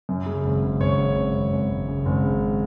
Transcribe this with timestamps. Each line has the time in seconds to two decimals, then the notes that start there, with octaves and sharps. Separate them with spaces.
0.09 F#2
0.26 C#3
0.44 G#1
0.63 C#3
0.80 G#1 C#5
0.98 C#3
1.16 G#1
1.34 G#1
1.53 G#1
1.70 G#1
1.88 C#3
2.06 G#1
2.24 C#3